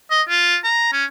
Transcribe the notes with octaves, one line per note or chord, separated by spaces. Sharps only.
D#5
F4
A#5
C#4